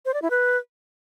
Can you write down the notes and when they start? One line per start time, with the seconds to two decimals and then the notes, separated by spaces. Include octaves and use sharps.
0.05 C5
0.14 D5
0.22 E4
0.30 B4